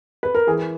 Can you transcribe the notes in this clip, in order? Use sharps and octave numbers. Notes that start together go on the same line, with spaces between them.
B4
A#4
E3 G#4